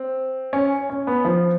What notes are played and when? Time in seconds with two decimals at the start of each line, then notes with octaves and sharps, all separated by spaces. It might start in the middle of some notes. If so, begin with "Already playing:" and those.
Already playing: C4
0.53 C#4
0.90 C#4
1.07 B3
1.25 F3